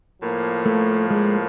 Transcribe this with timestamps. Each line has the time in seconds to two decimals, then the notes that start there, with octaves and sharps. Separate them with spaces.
0.21 A2 F3 A#3
0.66 A3
1.10 G#3